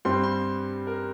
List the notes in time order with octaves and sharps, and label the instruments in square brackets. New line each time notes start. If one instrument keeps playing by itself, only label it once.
[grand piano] G2 G3 C4 C6
C6
A#4